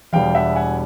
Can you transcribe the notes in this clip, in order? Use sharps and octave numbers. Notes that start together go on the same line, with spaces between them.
E1 E2 B2 G3 F5 G5
E5 F#5
F#5 G#5